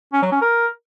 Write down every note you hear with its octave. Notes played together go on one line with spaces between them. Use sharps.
C#4
F#3
C#4
A#4